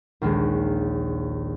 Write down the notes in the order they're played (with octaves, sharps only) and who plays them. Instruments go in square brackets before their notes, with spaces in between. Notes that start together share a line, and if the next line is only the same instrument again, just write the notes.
[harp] A#1 D#2 G#3